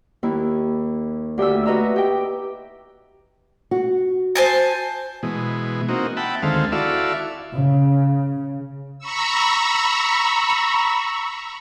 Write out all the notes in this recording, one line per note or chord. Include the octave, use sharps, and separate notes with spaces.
D#2 E4
D2 G4 E5 G#5 E6
F#4 B4 D#5 E5 A#5 E6
G4 G5
F#4
C5 G#5 A5
B2 E3 G#3
A#3 C4 D#4 F#4
E5 F#5 G5 A5 B5
D2 D#3 G#3 C4 A4 F5
E4 F#4 A4 D5 E5 F5
C#3
A#5 B5 C#6 E6